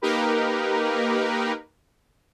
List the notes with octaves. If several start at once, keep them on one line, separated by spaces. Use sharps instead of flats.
A#3 D#4 G4 A#4 B4